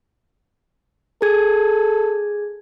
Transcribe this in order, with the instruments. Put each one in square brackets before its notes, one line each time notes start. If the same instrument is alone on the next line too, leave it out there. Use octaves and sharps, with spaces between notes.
[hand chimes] G#4 G#6 [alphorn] A4